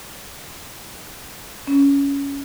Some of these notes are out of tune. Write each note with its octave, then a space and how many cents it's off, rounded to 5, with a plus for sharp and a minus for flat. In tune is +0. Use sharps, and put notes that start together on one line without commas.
C#4 +15